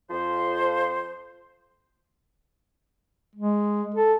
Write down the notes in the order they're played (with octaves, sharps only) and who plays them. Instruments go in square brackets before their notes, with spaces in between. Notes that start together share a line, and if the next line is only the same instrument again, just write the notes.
[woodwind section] F2 F3 C5
[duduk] G#3
A4